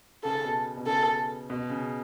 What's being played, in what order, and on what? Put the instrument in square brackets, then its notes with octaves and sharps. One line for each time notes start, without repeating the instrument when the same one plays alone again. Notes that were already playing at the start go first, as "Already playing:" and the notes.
[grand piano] C#3 [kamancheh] A4
[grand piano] B2
B2
[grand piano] C#3 [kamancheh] A4
[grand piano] B2
C#3